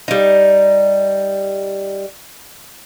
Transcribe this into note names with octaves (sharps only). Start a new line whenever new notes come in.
G3 D#4